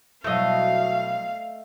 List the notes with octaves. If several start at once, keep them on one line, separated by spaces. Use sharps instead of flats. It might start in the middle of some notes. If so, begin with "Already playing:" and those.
B2 F#3 A3 E4 D#5 F5